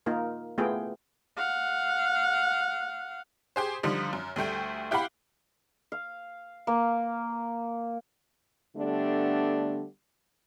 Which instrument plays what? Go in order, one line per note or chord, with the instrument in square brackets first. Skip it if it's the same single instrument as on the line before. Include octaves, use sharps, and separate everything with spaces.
[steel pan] A#3 D#4 F4 A#4
A3 B3 E4 F4 G#4 G5
[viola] F5 F#5
[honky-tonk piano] G4 G#4 C5
D3 F3 G3 D#4
F#2
D2 G3 A3 G5
E4 G4 F5 F#5 B5
[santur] F5
A#3
[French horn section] D3 G3 A3 B3 D4